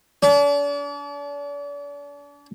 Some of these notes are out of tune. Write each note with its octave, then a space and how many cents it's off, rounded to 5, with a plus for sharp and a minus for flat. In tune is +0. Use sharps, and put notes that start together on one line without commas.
D4 -40